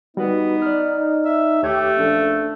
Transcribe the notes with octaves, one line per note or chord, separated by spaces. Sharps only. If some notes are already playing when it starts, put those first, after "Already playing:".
G3 B3 D#4 F#4 B4
D5 F6
E5
D#2 A3 G4 C#5 G#6
A#1 F3 C#4 D4 A4